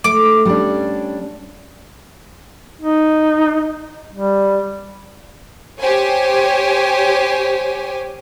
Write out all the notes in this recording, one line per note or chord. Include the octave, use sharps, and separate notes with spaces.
A3 D6
G3 C#4 D4
D#4
G3
G4 C5 C#5 G#5